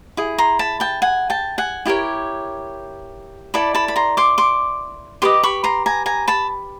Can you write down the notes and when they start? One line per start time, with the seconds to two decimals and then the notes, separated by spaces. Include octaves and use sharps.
0.17 E4 G#4
0.38 A#5 C6
0.59 A5 B5
0.80 G5 A5
1.02 F#5 G#5
1.30 G5 A5
1.58 F#5 G#5
1.86 E4 G4 A#4 C#5
3.54 E4 A4 D5 A5 B5
3.75 A5 B5
3.88 B5
3.96 A#5 C6
4.17 C6 D6
4.38 C6 D6
5.22 G4 B4 D#5 C6 D6
5.43 B5 C#6
5.64 A#5 C6
5.86 G#5 A#5
6.06 G#5 A#5
6.28 A5 B5